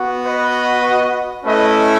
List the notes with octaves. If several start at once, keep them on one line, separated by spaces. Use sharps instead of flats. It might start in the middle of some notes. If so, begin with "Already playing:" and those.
Already playing: B3 F#4
B4 D#5
A3 C#4 E4 B4 D#5